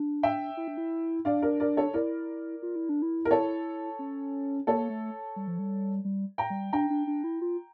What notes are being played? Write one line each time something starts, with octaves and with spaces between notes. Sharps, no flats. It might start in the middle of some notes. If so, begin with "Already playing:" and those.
Already playing: D4
E5 G5
E4
D4
E4
D4 D5 F5
A#4 D5
A#4 D5
A4 C#5
E4 A#4 D5
F4
E4
D4
E4
A#4
A4 C#5
C#4
A#3 A4 C#5
A3
G3
F3
G3
G3
G5 A#5
G3
D4 G5 A#5
D4
D4
E4
F4